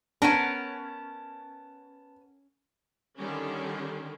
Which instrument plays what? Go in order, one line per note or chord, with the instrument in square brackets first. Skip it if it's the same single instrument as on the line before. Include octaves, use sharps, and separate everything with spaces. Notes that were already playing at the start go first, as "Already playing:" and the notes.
[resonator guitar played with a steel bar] B3 B4 F#5 [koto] C#4 A#4 [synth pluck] D4 [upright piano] A5
[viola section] D3 D#3 G3 C#4